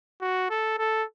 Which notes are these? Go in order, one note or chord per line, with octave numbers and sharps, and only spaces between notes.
F#4
A4
A4